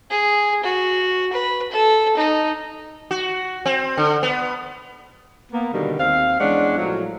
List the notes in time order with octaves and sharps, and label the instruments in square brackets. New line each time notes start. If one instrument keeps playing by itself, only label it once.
[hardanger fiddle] G#4
F#4
B4
A4
D#4
[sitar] F#4
C4
D3
B3
[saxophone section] A#3 B3
B2 D3 D#3 G3
D#2 C4 F5
E2 G#3 C#4 D4 F#5
A2 F3 F#3